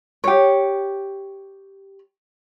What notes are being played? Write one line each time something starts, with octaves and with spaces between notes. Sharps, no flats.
G4 C#5